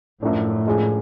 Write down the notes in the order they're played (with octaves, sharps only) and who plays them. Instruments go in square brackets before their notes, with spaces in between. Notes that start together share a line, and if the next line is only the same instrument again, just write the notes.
[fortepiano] F#2 F3 A3 D4 [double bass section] A2
[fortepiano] F3 G#3 D4 G#4